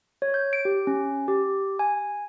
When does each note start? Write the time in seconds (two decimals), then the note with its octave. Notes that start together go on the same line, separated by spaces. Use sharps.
0.22 C#5
0.34 G6
0.53 D7
0.65 G4
0.87 C#4
1.28 G4
1.79 G#5